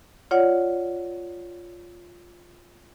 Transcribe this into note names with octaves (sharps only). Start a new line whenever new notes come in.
F4 C#5 D5 F#5